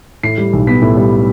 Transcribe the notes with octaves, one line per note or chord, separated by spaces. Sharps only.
A2 C7
G3
B1
B3 B6
A2
G3